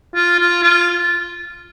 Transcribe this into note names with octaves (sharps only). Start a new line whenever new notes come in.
F4
F4
F4